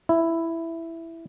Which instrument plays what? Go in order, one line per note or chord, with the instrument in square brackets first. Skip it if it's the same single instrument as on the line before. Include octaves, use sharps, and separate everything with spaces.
[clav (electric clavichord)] E4